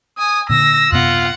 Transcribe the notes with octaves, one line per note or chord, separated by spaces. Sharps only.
G#5 D#6
A#2 D3 E6 A#6
F#2 C3 B3 F4 F#5